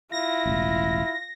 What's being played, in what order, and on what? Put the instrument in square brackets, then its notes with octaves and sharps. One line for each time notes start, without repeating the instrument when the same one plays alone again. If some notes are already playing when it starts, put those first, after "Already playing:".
[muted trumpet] E4 [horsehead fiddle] F4 [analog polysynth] A#6
[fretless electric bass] E1 A1